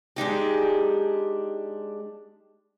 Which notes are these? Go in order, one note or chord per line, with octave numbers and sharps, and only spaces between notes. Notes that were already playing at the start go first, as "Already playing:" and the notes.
G#3 D4 D#4 G4